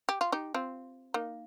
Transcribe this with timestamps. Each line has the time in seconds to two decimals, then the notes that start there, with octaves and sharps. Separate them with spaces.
0.09 G4
0.21 F4
0.32 D#4 G4
0.54 C4 F4
1.14 A#3 D#4